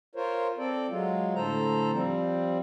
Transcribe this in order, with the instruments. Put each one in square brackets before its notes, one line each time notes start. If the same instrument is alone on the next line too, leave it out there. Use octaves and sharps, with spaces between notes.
[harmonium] F4 A#4 C5 C#5
C4 A4 D5
F#3 G#3 F4
A2 D3 A4 C5 A#5
F3 G3 C4